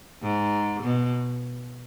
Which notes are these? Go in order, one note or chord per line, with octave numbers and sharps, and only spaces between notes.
G#2
B2